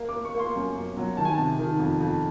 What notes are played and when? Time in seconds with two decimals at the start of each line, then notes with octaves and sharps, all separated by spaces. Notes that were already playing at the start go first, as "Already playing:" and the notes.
Already playing: A#3
0.09 D6
0.14 A#3
0.25 C#6
0.35 A#3 C6
0.56 F#2
0.77 F#2
0.97 F#3
1.17 D#3 A5
1.25 G#5
1.34 C3 A5
1.59 D#3
1.79 F2
2.01 F2